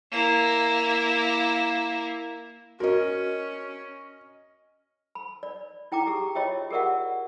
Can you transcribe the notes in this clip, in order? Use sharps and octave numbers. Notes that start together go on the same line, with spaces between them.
A#3 E4
C#4 F#4 A#4 D#5
B5
D5
E4 G5 A#5 D6
G4 G#4
F4 C#5 D#5 E5 G5
G4 G#4 A#4 D5 E5 F#5